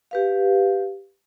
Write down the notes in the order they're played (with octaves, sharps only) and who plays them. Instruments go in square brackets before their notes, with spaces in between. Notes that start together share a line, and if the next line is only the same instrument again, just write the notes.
[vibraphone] G4 B4 F5